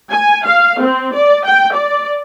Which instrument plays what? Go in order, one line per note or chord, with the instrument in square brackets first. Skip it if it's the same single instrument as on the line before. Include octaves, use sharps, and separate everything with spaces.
[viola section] G#5
F5
C4
D5
G5
D5